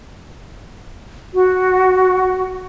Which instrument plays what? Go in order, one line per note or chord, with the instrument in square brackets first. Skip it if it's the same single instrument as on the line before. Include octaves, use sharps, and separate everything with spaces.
[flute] F#4